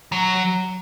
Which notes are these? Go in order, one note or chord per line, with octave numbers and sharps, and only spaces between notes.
F#3